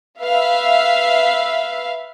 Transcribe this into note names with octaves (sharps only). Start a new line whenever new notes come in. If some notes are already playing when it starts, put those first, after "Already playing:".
B4 E5 F5